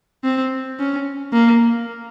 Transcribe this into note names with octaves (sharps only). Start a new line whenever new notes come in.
C4
C#4
A#3